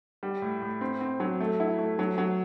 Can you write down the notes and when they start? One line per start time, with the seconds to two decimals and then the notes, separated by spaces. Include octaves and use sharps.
0.23 G3
0.42 A2
0.62 A2
0.81 C4
1.01 C4
1.20 F#3
1.40 A3
1.60 E4
1.79 A3
1.99 F#3
2.18 F#3